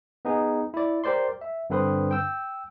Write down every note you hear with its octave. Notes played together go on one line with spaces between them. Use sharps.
B3 D#4 G#4
E4 D5
G4 A#4 C5 D5 C6
E5
G2 D3 C4 B4 C6 D#6
G5 E6 G6